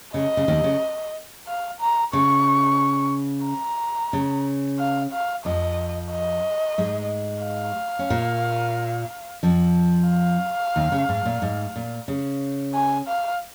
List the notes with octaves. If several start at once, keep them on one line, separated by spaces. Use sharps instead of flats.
C#3 D#5
C#3
D#2 D#3
C#3
F5
A#5
C#3 C#6
A#5
C#3
F5
F5
F2 F3 D#5
D#5
G#2 G#3
F5
C#4
A#2 A#3
F2 F3
F5
D#2 D#3
C#3
G#2
A#2
G#2
A#2
C#3
G#5
F5